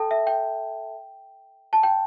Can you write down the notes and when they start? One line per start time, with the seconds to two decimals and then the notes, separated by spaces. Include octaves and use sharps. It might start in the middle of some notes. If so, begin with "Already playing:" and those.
Already playing: A4 G5 A5
0.11 E5
0.27 G5
1.73 A5
1.83 G5